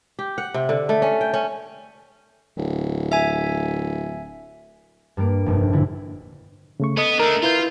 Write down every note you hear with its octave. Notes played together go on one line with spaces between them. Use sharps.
G4
F#5
C3
D3
A3
C#4
G5
C#4
D1
E5 G#5
G2 G3 A#3 D7
F1 A#1 G2
A#2 D3 E4
C#3 A3 C#6
B3 A4 D#5 D#6
A3 D4 A#4
E4 F4 B4 G6